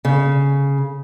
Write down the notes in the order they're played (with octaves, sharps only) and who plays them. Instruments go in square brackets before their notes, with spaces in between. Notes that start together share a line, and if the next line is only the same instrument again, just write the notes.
[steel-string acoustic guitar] C#3